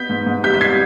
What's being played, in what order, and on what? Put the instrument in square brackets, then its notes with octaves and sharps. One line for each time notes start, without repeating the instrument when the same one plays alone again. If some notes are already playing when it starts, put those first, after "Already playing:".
Already playing: [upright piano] B3 G6 B6
G#2
G#2
G3 G6 B6
B6
G3 G#6 C7